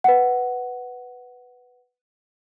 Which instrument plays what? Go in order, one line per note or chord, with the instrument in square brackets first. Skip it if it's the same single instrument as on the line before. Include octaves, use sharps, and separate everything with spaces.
[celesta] B4 F#5